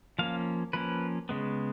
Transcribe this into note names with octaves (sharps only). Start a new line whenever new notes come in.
F3 A#3 C#4 F5
F3 A#3 C#4 B4
C#3 G#3 B3